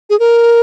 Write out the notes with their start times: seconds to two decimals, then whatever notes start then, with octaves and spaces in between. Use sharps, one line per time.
0.10 G#4
0.19 A#4